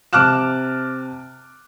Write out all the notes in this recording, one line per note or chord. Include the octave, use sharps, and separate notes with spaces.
C3 A5 D6 F6 F#6 E7